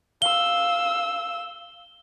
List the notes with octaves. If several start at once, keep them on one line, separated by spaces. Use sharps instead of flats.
F5 E6 G7